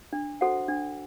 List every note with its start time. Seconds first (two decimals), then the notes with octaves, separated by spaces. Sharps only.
0.13 D4
0.41 F#4 A4 C5 F#5
0.68 D4